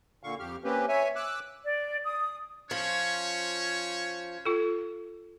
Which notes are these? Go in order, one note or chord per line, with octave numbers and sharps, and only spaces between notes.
A#2 D3 F5 C#6
F2 G4 F6
A#3 C4 C#4 G4 B4
C#5 E5 G#5
D6 E6 F#6
D5
D#6
F3 C#4 C5 C#5
F4 A4